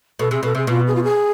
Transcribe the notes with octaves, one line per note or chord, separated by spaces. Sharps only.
B2 A4
C3 G#4
B2 A4
C3 G#4
B2 F4
G#4
F4
G#4